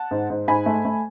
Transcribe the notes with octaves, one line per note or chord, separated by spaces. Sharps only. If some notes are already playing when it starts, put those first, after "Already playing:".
Already playing: F#5 A5
G#2
G#2
G#2 G#5 B5
A3
A3